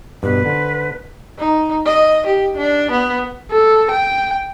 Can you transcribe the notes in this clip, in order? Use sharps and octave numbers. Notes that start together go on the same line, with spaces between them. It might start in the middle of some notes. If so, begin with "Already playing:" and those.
G2 B2 B4
D3 C5
D#4
D#5
G4
D4
B3
A4
G5